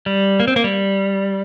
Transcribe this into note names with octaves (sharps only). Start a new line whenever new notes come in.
G3
A#3
C4
A#3
G3